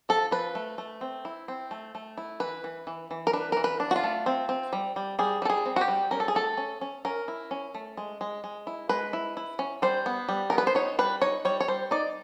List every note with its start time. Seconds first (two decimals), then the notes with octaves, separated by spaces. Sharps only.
0.09 F3 A4
0.31 F3 B4
0.55 A3
0.78 A3
1.01 C4
1.25 E4
1.48 C4
1.71 A3
1.95 A3
2.17 E4
2.40 E3 B4
2.64 E3
2.87 E3
3.11 E3
3.27 A#4
3.33 D4 B4
3.52 E3 A#4
3.64 B4
3.80 D4
3.91 F#4
3.96 F4
4.04 A3
4.26 C4
4.49 C4
4.73 G3
4.96 G3
5.19 G3 G#4
5.42 G3 A4
5.50 G#4
5.66 C4
5.76 F#4
5.81 G4
5.88 G3
6.11 C#4 A#4
6.20 A4
6.28 G#4
6.35 A3 A4
6.57 C#4
6.81 C#4
7.05 C#4 A#4
7.28 E4
7.51 C#4
7.75 A3
7.97 G#3
8.21 G#3
8.44 G#3
8.67 E4
8.89 G#3 B4
9.13 E4
9.37 E4
9.59 C#4
9.82 G3 C5
10.06 B3
10.29 G3
10.50 B3 A#4
10.58 B4
10.67 C5
10.75 D#4 C#5
10.99 G3 B4
11.22 D#4 C#5
11.45 G3 C#5
11.60 C#5
11.68 G3 C5
11.91 D#4 D5